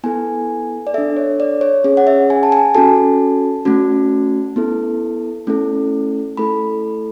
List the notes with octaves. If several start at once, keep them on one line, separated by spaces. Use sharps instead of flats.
B3 E4 A4 G#5
D5
D4 A4 E5
C#5
D5
C#5
C#4 G#4 C#5
F#5
E5
G#5
A5
G#5
C#4 F#4 A4 A5
A3 C#4 F#4
B3 E4 A4
A3 C#4 E4 A4
A3 E4 A4 B5